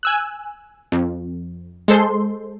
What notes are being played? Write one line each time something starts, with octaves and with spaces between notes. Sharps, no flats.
G#5 E6 F#6
F2
G#3 A4 C5 C6